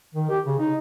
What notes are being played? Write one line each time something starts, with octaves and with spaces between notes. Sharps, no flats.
D#3
G4
C#3
D#4